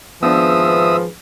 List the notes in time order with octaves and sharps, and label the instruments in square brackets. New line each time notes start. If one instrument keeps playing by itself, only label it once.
[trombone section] G#1 G#4 B4 [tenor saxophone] F3 [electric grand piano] B3 D4 [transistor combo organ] E5 D#6